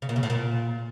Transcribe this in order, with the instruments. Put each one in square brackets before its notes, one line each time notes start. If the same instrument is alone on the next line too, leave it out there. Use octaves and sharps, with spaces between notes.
[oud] C#3
A#2
C#3
A2
A#2